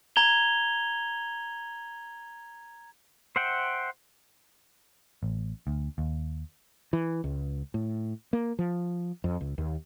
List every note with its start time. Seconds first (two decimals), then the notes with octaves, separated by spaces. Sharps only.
0.16 A#5 G#6 F7 G7
3.36 C5 E5 F#5 G5
5.23 A1
5.67 D2
5.98 D#2
6.93 E3
7.24 C#2
7.74 A2
8.33 A#3
8.59 F3
9.24 F2
9.41 C#2
9.58 D#2